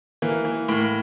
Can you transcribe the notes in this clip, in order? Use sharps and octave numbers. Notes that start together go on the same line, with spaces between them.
E3 A#3
E3
A2 A#3